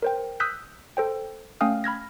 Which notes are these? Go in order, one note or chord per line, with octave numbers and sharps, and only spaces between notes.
A#4 C5 G5
D#6 E6 F#6 G6 B6
A4 C5 G5
A3 C#4 F5 G5 D#6 F6
B5 F6 G#6 A#6